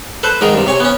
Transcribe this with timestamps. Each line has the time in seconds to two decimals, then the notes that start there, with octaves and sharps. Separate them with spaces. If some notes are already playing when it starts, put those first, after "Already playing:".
0.23 A4 B4 C5
0.41 G#2 D#3 A#4 D#6
0.54 G2 C3
0.66 C3 C#5 G#5
0.80 B3 C#4